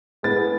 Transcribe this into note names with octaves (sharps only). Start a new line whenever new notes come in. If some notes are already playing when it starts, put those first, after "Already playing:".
A2 G#3 B3 A6